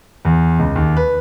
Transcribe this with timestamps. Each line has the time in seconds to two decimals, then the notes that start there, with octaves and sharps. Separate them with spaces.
0.25 E2
0.59 C#2
0.76 D#2
0.97 B4